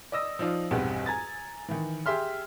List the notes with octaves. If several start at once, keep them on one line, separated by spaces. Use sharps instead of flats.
D5 D#5 D#6 E6 A#6
F3 D#4 F4 D5 F5
B1 E2 G2 C4 F#5
G#5 A#5 G#6 A6
D#3 E3
G4 G#4 E5 C6 F6